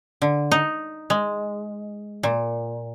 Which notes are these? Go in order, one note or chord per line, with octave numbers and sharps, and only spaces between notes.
D3
D#4
G#3
A#2